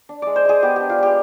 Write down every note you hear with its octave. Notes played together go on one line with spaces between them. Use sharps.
D4
G#3 D5
C5
G#3 G#4
B3 G4
D4 G4
F4
G#3 G4